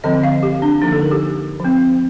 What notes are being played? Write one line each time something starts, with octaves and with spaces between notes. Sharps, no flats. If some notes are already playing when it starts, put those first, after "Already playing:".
D3 F3 C4 D#5
F5
G4
D4
D3 F3 A#3 D#4
A4
A#4
G4
F3 C4